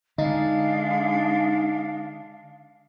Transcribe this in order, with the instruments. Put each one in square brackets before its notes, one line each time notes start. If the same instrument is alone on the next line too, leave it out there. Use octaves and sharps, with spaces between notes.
[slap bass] D3 [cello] G#3 D4 [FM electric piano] D#4 [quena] F5